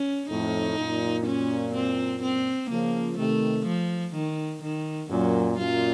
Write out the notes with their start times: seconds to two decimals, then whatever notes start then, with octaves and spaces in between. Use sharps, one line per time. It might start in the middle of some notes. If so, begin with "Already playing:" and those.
Already playing: C#4
0.30 F2 A2 D#4
0.78 F#2 A#2
1.26 C#4
1.74 C4
2.23 C4
2.70 C#3 F3 A#3
3.18 C3 D#3 A3
3.66 F3
4.14 D#3
4.62 D#3
5.10 F#2 A#2 F#3
5.58 F#2 A#2 F4